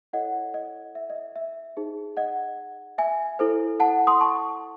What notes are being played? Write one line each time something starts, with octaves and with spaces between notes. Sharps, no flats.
E4 A4 C#5 D#5 F#5
D#5
E5
D#5
E5
E5
D#4 G#4 C5
D#5 F#5
E5 G#5
E4 A4 C5
F#5 A5
C6 D#6
A5 C#6